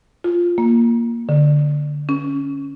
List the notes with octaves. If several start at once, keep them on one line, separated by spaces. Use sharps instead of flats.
F4
A#3
D3
C#4